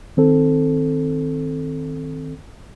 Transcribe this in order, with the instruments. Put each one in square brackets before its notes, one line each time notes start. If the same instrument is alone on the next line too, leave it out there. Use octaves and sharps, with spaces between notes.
[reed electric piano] D#3 C4 A4